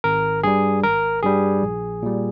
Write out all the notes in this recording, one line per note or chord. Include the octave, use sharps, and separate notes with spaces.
G#1 A#4
G2 G3 G#4
G#1 A#4
G2 G3 G#4
A#1
A#2 G3